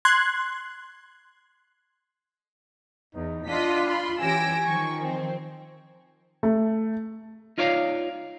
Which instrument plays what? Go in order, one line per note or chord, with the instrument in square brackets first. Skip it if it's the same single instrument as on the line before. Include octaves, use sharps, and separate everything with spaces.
[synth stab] C6 F#6 G#6
[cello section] E2 [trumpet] D#4
[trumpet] D4 [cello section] F4 [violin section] D#5 F#5 B6
[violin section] B5 C6
[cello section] E3 C#4 G4 [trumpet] G#5 [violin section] E6 A#6 D7
[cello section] D#3 F3 [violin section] C#6
[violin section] C4
[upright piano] A3
[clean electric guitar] D#4 F4 C#5 D5 F5